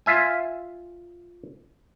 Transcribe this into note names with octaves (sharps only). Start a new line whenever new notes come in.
F4 E5 G#5